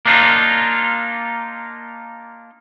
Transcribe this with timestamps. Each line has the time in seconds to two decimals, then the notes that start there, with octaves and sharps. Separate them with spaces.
0.06 A#3 D4 D#4 F4